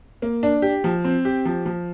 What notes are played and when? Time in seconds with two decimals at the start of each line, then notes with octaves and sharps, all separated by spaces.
0.22 A#3
0.43 D4
0.62 G4
0.84 F3
1.04 C4
1.25 G4
1.45 F3
1.66 F3